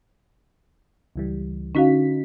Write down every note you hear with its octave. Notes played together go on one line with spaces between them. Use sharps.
C#2 E3 G3
D3 C#4 D#4 F#4 F5 B6